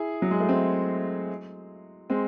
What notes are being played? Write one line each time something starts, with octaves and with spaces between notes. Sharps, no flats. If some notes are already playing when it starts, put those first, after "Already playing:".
Already playing: E4 G#4
F#3
G#3
A3
G#3 C4
G#3 C4